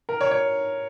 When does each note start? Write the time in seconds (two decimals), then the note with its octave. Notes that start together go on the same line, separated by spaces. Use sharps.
0.09 A#4
0.21 C#5
0.31 C#5